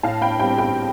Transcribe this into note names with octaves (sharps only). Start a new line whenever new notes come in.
A2 F5 A5
G5 B5
G3 C4 G5 B5
G5 B5